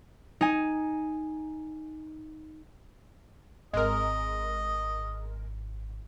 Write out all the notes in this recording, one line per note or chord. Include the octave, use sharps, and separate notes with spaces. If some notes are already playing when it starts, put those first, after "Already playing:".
D#4 G#5
G#1 G#3 A#4 D#5